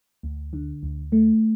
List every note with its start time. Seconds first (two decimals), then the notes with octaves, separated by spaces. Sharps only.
0.23 D2
0.53 D3
0.83 D2
1.12 A3